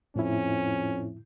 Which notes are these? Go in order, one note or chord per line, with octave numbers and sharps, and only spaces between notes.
F2 A2 C#4 E4